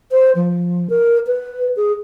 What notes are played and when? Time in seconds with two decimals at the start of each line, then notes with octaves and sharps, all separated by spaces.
0.11 C5
0.35 F3
0.90 A#4
1.27 B4
1.76 G#4